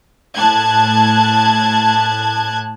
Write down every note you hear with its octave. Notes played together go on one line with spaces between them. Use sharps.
A2 A5 F#6 G#6